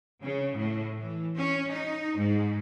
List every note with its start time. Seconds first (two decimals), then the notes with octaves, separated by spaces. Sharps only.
0.22 C#3
0.57 A2
0.98 E3
1.38 C#4
1.72 D#4
2.17 G#2